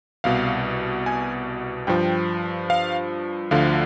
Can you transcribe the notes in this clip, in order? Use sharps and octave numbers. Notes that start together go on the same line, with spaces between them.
C2 B2 F5
G#5
G2 F3 G5
F5
D2 D3 F3 F5